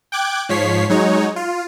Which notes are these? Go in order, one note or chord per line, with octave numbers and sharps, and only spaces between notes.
G5 D6 F#6 G#6
G#2 F3 C#5 B6 C7
F#3 G#3 D#4 C#5
F4